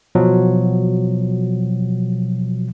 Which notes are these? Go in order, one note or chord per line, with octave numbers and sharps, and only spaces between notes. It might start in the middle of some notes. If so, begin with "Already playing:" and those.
B2 F3 F#3